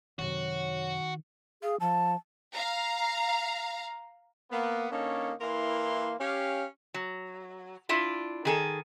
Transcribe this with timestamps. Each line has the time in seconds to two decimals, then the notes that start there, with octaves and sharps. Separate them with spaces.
0.19 F#2 C3 D#3 F#4 C#5
1.62 G#4 F5
1.80 F3 A5
2.53 F5 A#5
4.51 A#3 B3
4.91 D3 A#3 C#4 D#4 A4 C#5
5.41 E3 A#3 E4 A#4 C6
6.20 C#4 G4 F5
6.94 F#3
7.89 D4 E4 F4
8.45 D#3 G#4 A4